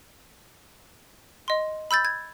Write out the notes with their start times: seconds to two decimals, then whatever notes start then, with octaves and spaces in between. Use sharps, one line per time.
1.48 D#5 C6
1.91 B5 E6 G6 A6
2.05 G#6